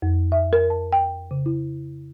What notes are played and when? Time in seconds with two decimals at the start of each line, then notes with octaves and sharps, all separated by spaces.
0.02 F2
0.32 E5
0.53 A#4
0.70 A5
0.93 G5
1.31 C#3
1.46 E4